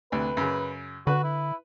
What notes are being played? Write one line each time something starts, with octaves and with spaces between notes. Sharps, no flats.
D2 C3 B4
F#2 C#3
D3 F#4 B4
E4